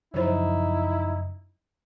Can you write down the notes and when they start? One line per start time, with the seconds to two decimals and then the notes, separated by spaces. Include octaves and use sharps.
0.14 F#2 C#3 F3 D#4 E4 C5 C#5